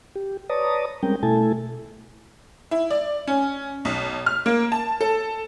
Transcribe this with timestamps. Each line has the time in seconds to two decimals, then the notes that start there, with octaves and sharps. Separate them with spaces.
0.16 G4
0.50 B4 C#5 D5 A5 A#5 D#6
1.03 G3 G#3 C4 C#4 A#4 G5
1.23 B2 A3 E4 A4 G#5 A5
2.71 E4
2.91 D5
3.27 C#4
3.85 B1
4.26 F6
4.46 A#3
4.72 A5
5.01 A4